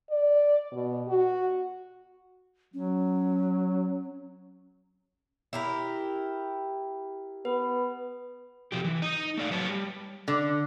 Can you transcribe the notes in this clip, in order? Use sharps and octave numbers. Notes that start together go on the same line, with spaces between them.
D5
B2
F#4
F#3 C#4
E4 G4 A#4
B3 B4
C3 F3 G4
E3
D#4 D#5
A3 D5 F5
F#3 B4 C#5 A5
G3
D3